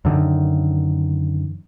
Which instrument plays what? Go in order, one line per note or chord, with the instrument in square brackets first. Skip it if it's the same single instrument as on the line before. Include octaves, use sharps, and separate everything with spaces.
[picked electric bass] F#2 D3 D#3